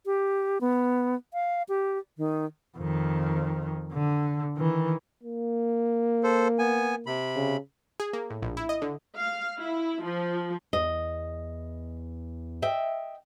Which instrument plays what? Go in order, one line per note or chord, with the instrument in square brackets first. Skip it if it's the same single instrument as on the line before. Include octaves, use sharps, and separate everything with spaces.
[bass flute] G4
B3
F5
G4
D#3
[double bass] F2 D#3
D3
D#3 E3
[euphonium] A#3
[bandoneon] A4 C5
B3 G#5
C3 B5
[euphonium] C#3
[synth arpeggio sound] G#4
A#3
A2
A#1
E4
D#5
D3
[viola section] F5
E4
F3
[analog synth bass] E2 [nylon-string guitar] D#5
[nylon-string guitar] D#5 E5 G5